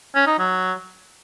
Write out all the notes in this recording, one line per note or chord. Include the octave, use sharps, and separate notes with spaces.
C#4
D#4
F#3